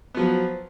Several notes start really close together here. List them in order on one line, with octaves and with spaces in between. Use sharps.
B3 F3 F#3